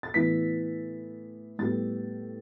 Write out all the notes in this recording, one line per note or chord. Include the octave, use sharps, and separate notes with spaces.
A6
A2 E3 B3 B6
A2 G3 B3 A6